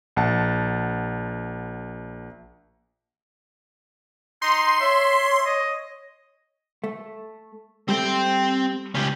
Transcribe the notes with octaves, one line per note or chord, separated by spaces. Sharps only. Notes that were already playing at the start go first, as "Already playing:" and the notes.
A#1 F#5 A5
D#4 C6
C#5 E5
D#5
A3
G3 A3 C4 G5
C#2 C#4 G4